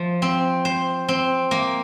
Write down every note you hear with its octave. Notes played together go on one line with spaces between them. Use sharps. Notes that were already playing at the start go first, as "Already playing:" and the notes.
Already playing: F3
C4
C5
C4
A#3